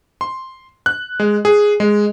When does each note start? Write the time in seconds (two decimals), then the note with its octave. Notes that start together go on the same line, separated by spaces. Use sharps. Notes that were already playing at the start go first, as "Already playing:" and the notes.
0.21 C6
0.86 F#6
1.20 G#3
1.45 G#4
1.80 G#3